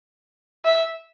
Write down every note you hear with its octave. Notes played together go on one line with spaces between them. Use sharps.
E5